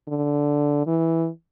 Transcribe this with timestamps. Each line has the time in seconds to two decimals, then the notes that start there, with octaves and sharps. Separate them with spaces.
0.08 D3
0.87 E3